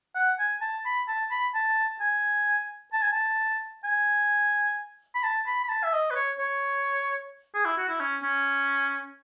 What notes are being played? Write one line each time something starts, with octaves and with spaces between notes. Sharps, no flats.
F#5
G#5
A5
B5
A5
B5
A5
G#5
A5
G#5
A5
G#5
B5
A5
B5
B5
A5
E5
D#5
B4
C#5
C#5
G#4
E4
F#4
E4
C#4
C#4